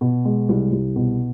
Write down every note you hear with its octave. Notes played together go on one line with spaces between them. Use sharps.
B2
G#3
C2
C2
B2